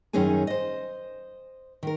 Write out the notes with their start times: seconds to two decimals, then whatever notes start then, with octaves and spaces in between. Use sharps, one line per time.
0.13 F#2 D#3 C#4 D#4 G#4 G#5
0.47 C5 D#5
1.83 D#3 A#4